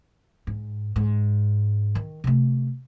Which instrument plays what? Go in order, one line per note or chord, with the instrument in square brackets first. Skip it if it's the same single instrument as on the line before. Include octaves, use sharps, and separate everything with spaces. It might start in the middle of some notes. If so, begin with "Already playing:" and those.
[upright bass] G#2
G#2
D#3
C3 A3